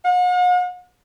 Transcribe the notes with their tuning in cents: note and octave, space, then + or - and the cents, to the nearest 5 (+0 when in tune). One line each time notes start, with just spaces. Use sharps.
F#5 -45